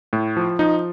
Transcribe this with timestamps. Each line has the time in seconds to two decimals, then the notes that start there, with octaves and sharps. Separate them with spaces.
0.13 A2
0.37 F3
0.59 F3 D#4